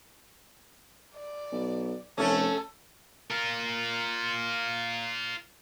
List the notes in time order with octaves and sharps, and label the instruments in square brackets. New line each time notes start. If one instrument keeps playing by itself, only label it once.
[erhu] D5
[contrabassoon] B1
[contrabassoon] F1 [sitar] A3 C#4 [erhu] A4
[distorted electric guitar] F4 A#4